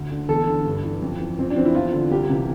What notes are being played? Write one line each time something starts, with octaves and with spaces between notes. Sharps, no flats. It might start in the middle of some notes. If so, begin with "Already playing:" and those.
Already playing: D2
D3
E2 A4
D3
G2
E3
F2
E3
F2 C4
D4
E3 C4
E4
E2 F4
D3
C2 G4
C3 E3